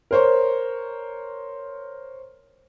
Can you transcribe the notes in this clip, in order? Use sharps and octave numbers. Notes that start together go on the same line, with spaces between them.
A#4 C5 C#5